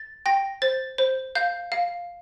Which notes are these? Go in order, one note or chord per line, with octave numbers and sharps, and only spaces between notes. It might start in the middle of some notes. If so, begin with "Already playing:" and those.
Already playing: A6
G5 A#6
C5 A6
C5
F5 G6
F5